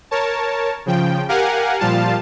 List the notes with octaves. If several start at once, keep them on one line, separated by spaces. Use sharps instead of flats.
A#4 C#5 A5
C#3 F3 G5
G4 A#4 F5 F#5 G#5
A#2 F3 G3 F4 F5 A5